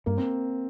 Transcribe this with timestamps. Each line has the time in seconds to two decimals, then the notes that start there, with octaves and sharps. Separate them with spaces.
0.06 G2 A#3
0.18 C4